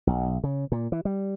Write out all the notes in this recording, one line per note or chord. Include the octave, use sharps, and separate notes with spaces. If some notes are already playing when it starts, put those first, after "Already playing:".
B1
C#3
A#2
E3
G3